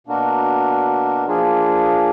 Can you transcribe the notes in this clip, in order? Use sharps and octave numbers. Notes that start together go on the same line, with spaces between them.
B2 A#3 D4 F#4 A#4
F3 A#3 D4 F4 G#4